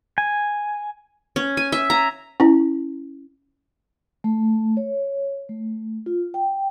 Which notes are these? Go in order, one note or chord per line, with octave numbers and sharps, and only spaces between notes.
G#5
C#4
G#5
E5
A#5
C#4 E4
A3
C#5
A3
F4
G5